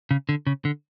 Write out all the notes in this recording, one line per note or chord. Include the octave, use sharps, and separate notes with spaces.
C#3
D3
C#3
D3